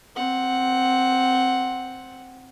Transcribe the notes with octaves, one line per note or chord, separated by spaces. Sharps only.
C4 F#5